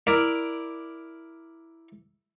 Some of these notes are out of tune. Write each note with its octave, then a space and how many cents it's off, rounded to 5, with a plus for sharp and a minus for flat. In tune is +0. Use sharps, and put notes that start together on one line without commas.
E4 +0 A#4 +5 D5 +0